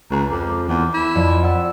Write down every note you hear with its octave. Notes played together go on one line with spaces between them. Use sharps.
C#2 A#5
F2 D6
E2 D6
E4
F2 D5
F#5 E6